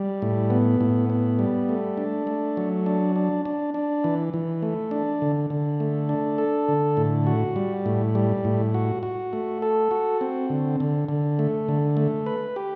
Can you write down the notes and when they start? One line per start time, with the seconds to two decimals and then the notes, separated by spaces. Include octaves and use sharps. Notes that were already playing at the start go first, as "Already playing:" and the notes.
Already playing: G3
0.22 A2
0.50 B3
0.81 A2
1.10 B3
1.39 G3
1.69 A3
1.98 D4
2.27 A3
2.57 F#3
2.86 D4
3.16 D4
3.45 D4
3.74 D4
4.04 E3
4.34 E3
4.62 A3
4.91 D4
5.22 D3
5.50 D3
5.80 A3
6.09 D4
6.38 A4
6.69 D3
6.97 A2
7.27 F#4
7.56 G3
7.86 A2
8.15 G3
8.45 A2
8.74 F#4
9.03 F#4
9.33 A3
9.62 A4
9.91 F#4
10.21 C4
10.50 D3
10.80 D3
11.09 D3
11.39 A3
11.69 D3
11.97 A3
12.26 B4
12.56 G4